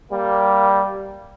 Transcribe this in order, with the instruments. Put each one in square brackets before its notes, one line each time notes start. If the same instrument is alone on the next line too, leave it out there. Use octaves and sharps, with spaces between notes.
[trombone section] G3 A#3